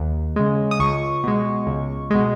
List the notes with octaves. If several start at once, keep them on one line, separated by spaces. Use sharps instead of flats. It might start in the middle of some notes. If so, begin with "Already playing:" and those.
Already playing: D#2
C#3 G#3
D#6
C#2 C#6
B2 G#3
C#2
B2 G#3